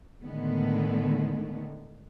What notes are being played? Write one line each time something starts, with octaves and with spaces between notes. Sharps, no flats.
A2 D3 D#3 G#3 A3 B3